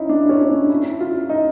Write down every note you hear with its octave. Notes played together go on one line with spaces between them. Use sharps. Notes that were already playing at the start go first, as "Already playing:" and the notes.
Already playing: C#4 D#4 E4
D4
C#4
D4
E4
F4
D#4